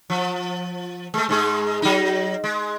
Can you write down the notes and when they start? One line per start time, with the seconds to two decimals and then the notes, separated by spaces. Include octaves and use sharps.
0.10 F3
1.14 G#3 A3
1.29 G#2 G#3 G#4
1.82 F#3 D#4
2.44 G#3